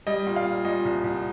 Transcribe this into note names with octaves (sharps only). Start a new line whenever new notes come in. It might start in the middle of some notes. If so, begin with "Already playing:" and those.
G3 D#5
A#2
F5
A#2
A#2 D#5
C2
C2